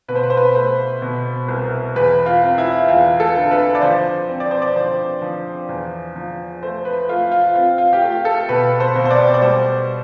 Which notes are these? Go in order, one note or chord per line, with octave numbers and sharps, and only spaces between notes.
B2 B4
C5
B4
C5
B4
A3 C5
B2
C2
E2 B4
F4
C4
E4
E2 F4
A4
D3
B4
D5
F3 C5
C4
D5
C5
D5
F3 C5
F3
E2
F3
A3 C5
B4
A3 F4
F4
C4 F4
F4
G4
A3 F4
A4
B2 B4
C5
B2
C5
D5
D5
G3 C5